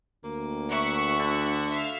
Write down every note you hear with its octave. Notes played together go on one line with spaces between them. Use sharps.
D2 A#3
E5 F#5 C#6
D3
E5 F5